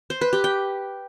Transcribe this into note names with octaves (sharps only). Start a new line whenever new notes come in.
C5
B4
G4
G5